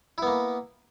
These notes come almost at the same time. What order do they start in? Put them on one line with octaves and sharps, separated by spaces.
E4 B3 A#3